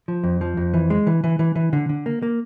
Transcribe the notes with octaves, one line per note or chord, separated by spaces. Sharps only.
F3
F2
F3
F2
E3
G#3
E3
E3
E3
E3
D3
D3
A#3
A#3